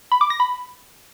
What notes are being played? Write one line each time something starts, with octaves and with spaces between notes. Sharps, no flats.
B5
D6
A#6
B5